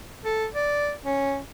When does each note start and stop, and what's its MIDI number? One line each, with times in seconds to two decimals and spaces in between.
0.25 0.47 69
0.54 0.92 74
1.05 1.39 61